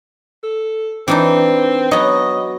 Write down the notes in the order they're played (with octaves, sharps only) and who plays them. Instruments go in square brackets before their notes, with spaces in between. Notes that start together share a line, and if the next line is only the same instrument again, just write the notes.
[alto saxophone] A4
[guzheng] E3 D4 D#4 [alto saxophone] C4
[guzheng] F#3 B3 [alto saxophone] D#5